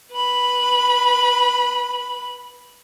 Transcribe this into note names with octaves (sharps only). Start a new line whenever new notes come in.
B4 B5